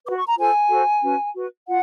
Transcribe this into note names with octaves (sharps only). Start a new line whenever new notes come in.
F#4 B4 D6
C#6
A#5
F4 A4 C5 G#5
F#4 A4 C5
C#4 F#4 B4
F#4 B4
F4 F#5